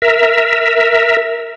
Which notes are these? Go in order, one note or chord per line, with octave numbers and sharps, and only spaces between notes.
A#4 E5